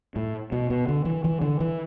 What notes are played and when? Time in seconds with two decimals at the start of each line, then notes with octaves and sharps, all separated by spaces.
0.16 A2
0.52 B2
0.70 B2
0.88 D3
1.05 E3
1.24 E3
1.42 D3
1.60 E3